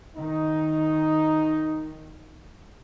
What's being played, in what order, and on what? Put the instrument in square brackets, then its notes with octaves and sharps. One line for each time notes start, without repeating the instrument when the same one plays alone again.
[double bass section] D#3 [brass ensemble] D#4